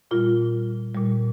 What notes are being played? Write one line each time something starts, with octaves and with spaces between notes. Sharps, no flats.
A#2 G3 F4
A#2 G3